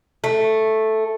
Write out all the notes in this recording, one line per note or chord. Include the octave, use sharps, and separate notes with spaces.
A3